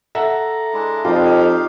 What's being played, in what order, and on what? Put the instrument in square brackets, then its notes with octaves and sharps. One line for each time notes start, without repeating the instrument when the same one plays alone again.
[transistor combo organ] A4 A#5 [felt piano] E5 F#5
[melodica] G#3 D4 E4
[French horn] F2 [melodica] D#4 G4 F5 [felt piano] F4 D5 [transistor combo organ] G5